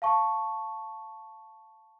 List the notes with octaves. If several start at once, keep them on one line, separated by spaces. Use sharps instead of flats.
F5 A5 C#6